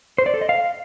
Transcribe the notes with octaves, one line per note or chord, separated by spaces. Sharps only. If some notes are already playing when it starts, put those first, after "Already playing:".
C5
D5
A4
D#5
F5